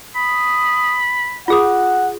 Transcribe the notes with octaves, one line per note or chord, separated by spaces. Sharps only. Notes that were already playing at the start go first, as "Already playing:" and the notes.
B5 D#6
F4 G#4 F#5 D#6